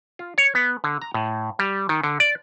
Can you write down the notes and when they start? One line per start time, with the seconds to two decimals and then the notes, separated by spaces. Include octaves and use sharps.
0.19 F4
0.38 C#5
0.55 B3
0.84 D3
1.02 A#5
1.14 A2
1.59 G3
1.89 D#3
2.04 D3
2.20 D5